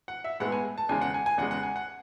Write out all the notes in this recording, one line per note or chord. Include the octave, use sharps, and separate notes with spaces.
F#5
E5
A2 G#3 B3 F#5
G#5
A5
E2 C#3 G#3 G#5
F#5
G#5
G#5
E2 C#3 G#3 F#5
F#5
G#5
F#5